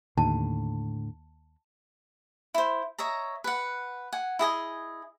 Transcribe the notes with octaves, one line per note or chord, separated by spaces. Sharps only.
D#2 A2 D3 A5
E4 C5
C#5 D#5 E5 A#5
B4 F#5
F#5 G#5
E4 G#4 D#5 G#5